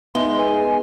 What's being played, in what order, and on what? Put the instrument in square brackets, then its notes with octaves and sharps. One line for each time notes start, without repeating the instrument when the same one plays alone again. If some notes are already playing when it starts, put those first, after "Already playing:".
[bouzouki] G#3 [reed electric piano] B3 D#4 [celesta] E5 G7 [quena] C6
[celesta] B4 [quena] G#5